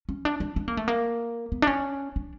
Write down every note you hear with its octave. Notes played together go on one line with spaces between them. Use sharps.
C#4
D4
D4
D4
A#3
A3
A#3
B3
D4
C#4
D4